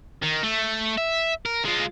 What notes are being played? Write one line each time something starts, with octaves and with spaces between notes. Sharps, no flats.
D#3
A3
E5
A#4
G#3 F4